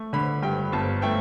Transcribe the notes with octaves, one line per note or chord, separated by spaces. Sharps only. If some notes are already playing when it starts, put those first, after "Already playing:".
Already playing: A3
D3 B5
G2 G5
G1 A5
A3 G5